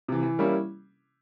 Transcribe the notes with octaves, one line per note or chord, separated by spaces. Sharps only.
C3 E3
E3
G3 A#3 C#4 E4